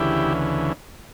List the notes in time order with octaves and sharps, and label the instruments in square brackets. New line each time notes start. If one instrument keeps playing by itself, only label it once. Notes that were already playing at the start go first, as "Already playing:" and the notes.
Already playing: [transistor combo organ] D2 C#3 E3 E4 G4